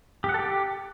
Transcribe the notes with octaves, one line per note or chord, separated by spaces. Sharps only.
G4
F#5
A4
G4